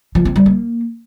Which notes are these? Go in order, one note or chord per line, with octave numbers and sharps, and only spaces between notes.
F3
C4
G3
A#3